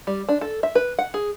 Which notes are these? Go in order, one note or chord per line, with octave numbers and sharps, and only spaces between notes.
G3
D4
A4
E5
B4
F#5
G#4